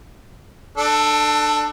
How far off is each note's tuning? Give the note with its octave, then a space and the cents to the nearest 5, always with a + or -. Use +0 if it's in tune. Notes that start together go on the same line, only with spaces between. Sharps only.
D4 +30 A4 +5